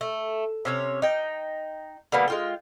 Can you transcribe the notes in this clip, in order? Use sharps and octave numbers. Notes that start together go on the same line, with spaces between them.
A3
C3 C#4 C#5
D#4 G5
D3 G3 A#3 B3
G#3 F4 G5